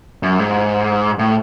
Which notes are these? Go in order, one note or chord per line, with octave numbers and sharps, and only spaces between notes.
F#2
G#2
A2